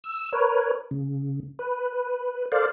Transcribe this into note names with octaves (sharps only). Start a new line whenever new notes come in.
E6
A#4 B4 C#5
C#3
B4
A4 A#4 C5 D5 F5